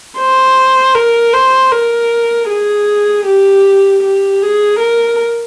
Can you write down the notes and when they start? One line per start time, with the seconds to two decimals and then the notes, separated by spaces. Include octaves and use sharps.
0.18 C5
0.95 A#4
1.33 C5
1.71 A#4
2.49 G#4
3.26 G4
4.03 G4
4.42 G#4
4.80 A#4